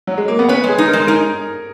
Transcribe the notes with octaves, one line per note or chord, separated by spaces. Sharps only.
F#3
G#3
A#3
B3
C#4 B4
G#3 G#4
D#4
A#4
G#3
D#4 A#4